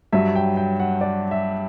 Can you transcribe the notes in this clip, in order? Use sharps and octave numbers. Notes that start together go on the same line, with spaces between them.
G2 F#3 E5
G5
G5
F#5
D5
E5